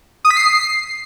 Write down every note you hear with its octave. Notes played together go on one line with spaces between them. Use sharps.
D#6
B6
C7